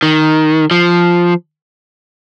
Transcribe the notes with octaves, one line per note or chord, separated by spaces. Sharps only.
D#3
F3